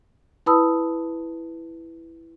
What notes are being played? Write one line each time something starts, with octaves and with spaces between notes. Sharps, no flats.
E4 B4 A5 B5 D#6 E6